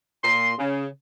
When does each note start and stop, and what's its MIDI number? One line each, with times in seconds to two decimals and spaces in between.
0.24 0.52 46
0.24 0.52 84
0.58 0.86 49